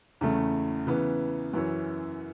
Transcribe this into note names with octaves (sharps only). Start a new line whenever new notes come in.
E2 C#3 A3
C#3 E3 B3
F#2 E3 C#4